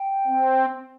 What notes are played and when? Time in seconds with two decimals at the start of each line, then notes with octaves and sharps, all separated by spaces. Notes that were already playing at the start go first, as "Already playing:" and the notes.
Already playing: G5
0.27 C4